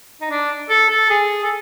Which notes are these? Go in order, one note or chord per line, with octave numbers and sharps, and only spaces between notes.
D#4
D4
A4
A4
G#4
A4